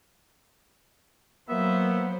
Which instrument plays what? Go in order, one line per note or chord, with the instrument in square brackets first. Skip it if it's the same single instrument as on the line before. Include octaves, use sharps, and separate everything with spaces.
[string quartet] F#3 C5 [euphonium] A#3 [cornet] B3 [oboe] E5